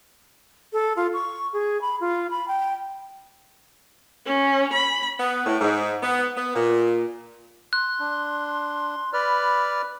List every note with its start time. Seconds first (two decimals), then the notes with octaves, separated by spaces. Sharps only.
0.73 A4
0.97 F4
1.13 C#6
1.53 G#4
1.81 B5
2.00 F4
2.31 B5
2.48 G5
4.26 C#4
4.74 B5
5.20 B3
5.46 A2
5.61 G#2
6.03 B3
6.37 B3
6.55 A#2
7.73 C6 F#6
8.00 D4
9.13 B4 D5 B5 F6